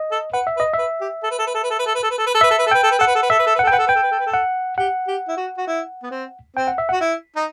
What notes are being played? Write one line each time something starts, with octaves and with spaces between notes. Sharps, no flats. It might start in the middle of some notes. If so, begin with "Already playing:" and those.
Already playing: D#5
A4
B4 F#5
E5
B4
D#5
E5
B4
G4
A4
B4
A4
B4
A4
B4
A4
B4
A4
B4
A4
B4
A4
B4
A4
B4 E5
A4
B4
A4
B4 G5
A4
B4
A4 F#5
B4
A4
B4
A4 E5
B4
A4
B4
F#5
A4
G5
B4 F#5
A4
B4 G5
A4
B4
A4
B4
A4
F#5
G4 F#5
G4
E4
F#4
F#4
E4
B3
C4
C4 G5
F#5
E5
F#4 F#5
E4
D#4